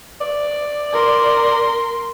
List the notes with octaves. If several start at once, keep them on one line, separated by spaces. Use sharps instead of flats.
D5
A#4 C6